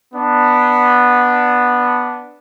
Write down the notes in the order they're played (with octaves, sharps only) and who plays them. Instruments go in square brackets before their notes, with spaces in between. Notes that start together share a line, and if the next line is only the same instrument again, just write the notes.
[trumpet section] B3 D4